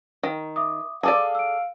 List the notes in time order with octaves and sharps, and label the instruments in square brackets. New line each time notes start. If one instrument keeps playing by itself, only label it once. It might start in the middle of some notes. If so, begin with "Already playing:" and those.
[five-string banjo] D#3
[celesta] E5 D6 D#6
[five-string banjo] G#4 A4 D5 [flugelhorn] F5 [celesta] A5 D6 D#7
[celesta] E6 D7